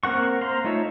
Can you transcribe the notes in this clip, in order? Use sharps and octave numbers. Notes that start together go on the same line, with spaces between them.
A#3 C4 A#4 F#5 C#6
C5 F5 A#5 C6
A3 D#4 F4 C#5 E5